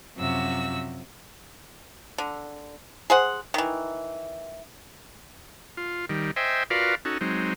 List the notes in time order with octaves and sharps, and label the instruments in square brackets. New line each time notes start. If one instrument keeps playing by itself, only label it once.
[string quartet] F#2 C3 F3 F#4 E6
[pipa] D3
G#4 C5 F#5
D#3 E3
[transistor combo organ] F4
D#3 G3
C5 D#5 E5 G5 G#5
F4 F#4 A#4 B4 D5 F5
C#4 D#4 F#4 A4
F#3 G#3 C4 D#4